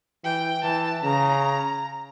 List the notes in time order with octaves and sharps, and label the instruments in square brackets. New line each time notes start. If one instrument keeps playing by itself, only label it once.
[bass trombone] E3 [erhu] G5
[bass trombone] E3 [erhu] A5
[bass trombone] C#3 [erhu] A#5